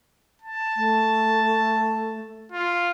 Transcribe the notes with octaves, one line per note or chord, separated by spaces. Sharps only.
A5
A3
F4